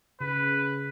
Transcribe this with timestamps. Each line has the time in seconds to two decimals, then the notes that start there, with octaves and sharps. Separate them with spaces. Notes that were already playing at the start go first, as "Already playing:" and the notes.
0.21 C#3 B4